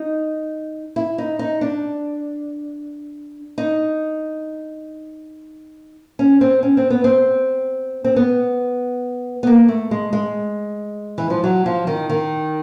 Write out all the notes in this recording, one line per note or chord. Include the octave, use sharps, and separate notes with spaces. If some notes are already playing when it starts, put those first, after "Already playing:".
Already playing: D#4
E4
D#4
D#4
D4
D#4
C#4
C4
C#4
C4
B3
C4
C4
B3
B3
A#3
A3
G#3
G#3
E3
F3
F#3
F3
D#3
D#3